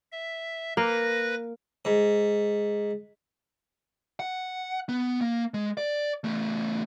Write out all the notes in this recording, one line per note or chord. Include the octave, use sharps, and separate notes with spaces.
E5
A#3 B4 A#6
G#2
F#5
B3
A#3
G#3
D5
E2 A3